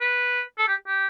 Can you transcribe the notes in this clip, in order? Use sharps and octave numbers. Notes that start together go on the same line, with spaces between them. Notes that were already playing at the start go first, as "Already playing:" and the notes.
B4
A4
G4
G4